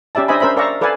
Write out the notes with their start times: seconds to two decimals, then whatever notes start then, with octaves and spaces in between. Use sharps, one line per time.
0.15 C#4 G4 D5 E5 A5
0.28 D4 C5 D#5 E5 G#5 B5
0.40 C#4 A#4 C5 E5 B5
0.57 A#4 D5 E5 F5 A#5 C#6
0.81 A4 B4 D5 F5 G#5 A5